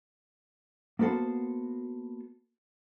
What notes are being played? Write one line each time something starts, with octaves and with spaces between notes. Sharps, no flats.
A#3 B3 F#4 A4 C5